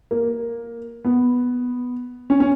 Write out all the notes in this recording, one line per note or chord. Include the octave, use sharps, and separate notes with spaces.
A#3
B3
C#4
C#4